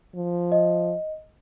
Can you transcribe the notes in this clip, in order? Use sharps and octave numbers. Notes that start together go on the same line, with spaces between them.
F3
D#5